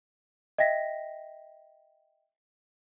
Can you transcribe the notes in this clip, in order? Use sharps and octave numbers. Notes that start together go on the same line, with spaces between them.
D#5 E5 G5 A#6 B6